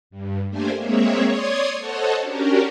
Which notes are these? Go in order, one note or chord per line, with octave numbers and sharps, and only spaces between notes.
G2
A3 A#3 D4 G4 C5 G#5
G#3 A#3 C4 G#4 C#5 E5
C#5 D5 C6 D#6 G#6
A4 C5 C#5 D#5 F#5 A5
C#4 D4 F#4 G4 A#4